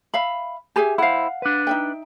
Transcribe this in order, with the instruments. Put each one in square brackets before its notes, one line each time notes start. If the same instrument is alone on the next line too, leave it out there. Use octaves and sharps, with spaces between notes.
[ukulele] E5 F5 B5
[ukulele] G4 G#4 E5 [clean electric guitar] G#5
[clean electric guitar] E4 C5 [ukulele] F5 F#5
[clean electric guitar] D4 B4
[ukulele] D#4 E5 G5